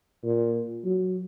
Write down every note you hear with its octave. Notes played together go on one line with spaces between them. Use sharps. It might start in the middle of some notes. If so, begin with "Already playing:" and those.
A#2
F#3